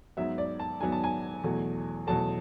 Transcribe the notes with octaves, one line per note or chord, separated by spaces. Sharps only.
G#2 F#3 B3 E5
D5
A5
G#2 F#3 B3 G#5
A5
G#5
E2 B2 F#3 A3
E2 B2 F#3 A3 A5